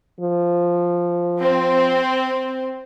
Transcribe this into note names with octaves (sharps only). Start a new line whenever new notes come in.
F3
C4